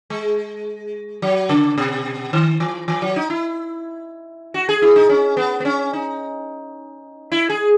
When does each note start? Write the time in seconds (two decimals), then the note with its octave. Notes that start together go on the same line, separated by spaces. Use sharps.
0.10 G#3
1.22 F#3
1.49 C#3
1.78 B2
2.33 D#3
2.60 E3
2.88 E3
3.02 F#3
3.16 D#4
3.30 E4
4.54 F#4
4.69 G#4
4.82 E4
4.96 D#4
5.09 C#4
5.37 B3
5.60 B3
5.65 C#4
5.93 D#4
7.32 E4
7.50 G#4